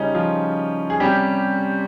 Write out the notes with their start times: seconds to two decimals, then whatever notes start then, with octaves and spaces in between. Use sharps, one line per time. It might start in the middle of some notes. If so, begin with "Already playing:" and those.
Already playing: C#3 G3 C#4 D#4
0.14 F3 F4
0.90 G#4
1.00 C3 G3 C#4 G4